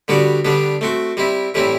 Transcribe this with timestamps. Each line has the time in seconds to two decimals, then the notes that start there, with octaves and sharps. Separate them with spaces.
0.08 D3 G3 B3 F#4
0.45 D3 G3 B3 D4
0.81 A3 C4 F#4
1.17 G3 C4 E4
1.54 A2 E3 G3 C4 E4